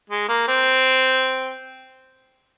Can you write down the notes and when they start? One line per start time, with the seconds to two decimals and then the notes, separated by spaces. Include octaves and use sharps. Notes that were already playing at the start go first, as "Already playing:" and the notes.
0.10 G#3
0.29 A#3
0.48 C4